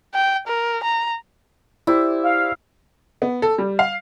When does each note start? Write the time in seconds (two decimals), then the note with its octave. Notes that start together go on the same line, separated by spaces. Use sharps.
0.14 G5
0.48 A#4
0.84 A#5
1.87 E4 G4 C5 D5
2.23 F5
3.22 B3
3.42 A4
3.58 G3
3.79 F5